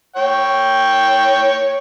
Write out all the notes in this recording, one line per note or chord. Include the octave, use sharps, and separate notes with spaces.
C#5 G5